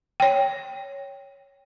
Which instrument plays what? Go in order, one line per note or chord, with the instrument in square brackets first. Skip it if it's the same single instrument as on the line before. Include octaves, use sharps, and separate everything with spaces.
[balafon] C#5 G5